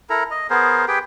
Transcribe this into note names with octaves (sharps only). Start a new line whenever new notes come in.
E4 A4 A#4 A#5
D#5
B3 G#4 A#4 C5
G4 G#4 B4 G5